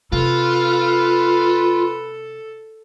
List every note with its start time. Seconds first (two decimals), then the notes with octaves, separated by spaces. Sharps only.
0.12 C3 F4 A4 B4